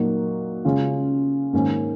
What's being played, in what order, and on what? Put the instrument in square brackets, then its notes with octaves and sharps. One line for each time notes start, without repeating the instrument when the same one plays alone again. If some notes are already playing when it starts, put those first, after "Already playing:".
Already playing: [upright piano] A#2 F#3 A#3 D#4 F#4
C#3 G#3 C#4 F4
G#2 D#3 A#3 C#4